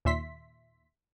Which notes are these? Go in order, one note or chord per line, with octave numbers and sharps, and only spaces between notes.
D#2 A#2 E5 C6 B6